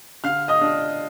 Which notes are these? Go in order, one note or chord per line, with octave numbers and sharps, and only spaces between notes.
D3 F5 F6
D#5 D#6
D4